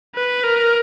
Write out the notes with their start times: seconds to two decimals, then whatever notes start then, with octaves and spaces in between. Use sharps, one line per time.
0.15 B4
0.44 A#4